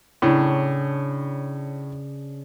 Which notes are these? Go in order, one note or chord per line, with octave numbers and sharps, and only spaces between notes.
A2 C#3 D4